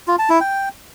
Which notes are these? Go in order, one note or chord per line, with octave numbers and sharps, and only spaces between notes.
F4
A5
E4
G5